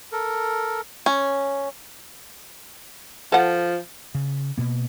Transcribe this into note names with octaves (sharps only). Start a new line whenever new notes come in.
A4 A#4
C#4
F3 A4 F#5
C#3
B2 A#3